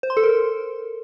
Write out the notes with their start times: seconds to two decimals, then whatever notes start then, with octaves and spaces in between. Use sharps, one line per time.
0.03 C5
0.10 C6
0.17 A4
0.23 A#4